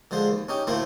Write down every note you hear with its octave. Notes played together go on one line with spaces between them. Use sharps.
D3 F3 G#3 C5
D#2
C#4 D#4 G4
D2 A2 A3 A#3 E4 C5